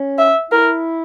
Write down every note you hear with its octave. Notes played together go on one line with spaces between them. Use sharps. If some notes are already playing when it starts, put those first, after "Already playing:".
Already playing: C#4
E5
E4 A#4